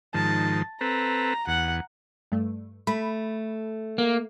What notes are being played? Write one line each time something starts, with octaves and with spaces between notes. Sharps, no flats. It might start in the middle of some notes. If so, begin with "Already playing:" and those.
G#2 D#3 F3 A5
C4 A4 B4 A#5
E2 F#5
G2 A3
A3 B5
A#3